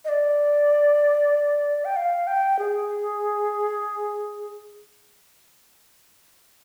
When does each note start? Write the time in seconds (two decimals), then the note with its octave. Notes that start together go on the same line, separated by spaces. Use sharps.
0.05 D#5
0.09 D5
1.85 G5
1.96 F5
2.27 G5
2.59 G#4